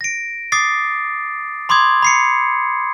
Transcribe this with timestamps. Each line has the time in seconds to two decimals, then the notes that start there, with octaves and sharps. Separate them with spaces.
0.01 A#6 D7
0.52 D6 D#6 A6 C7
1.69 B5 C6 D6 D#6 G#6
2.03 B5 C7 C#7